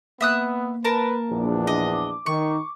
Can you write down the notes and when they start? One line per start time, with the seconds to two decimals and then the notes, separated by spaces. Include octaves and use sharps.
0.21 A#3 B3 E5 D#6 F#6
0.84 A#4 B4 A5
1.30 A#1 E2 D4
1.67 D#5 D6
2.26 D#3 C#6